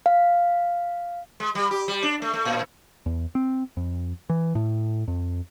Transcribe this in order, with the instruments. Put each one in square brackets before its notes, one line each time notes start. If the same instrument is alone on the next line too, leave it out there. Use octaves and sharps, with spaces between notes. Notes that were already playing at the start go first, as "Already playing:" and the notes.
[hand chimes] F5
[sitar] G#3
G3
G4
G3
D4
A3
A3
A2
[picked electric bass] E2
C4
F2
E3
A2
F2